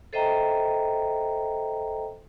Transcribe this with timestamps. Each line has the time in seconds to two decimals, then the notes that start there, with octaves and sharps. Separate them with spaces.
0.13 A4 C5 D#5 E5 G5 A#5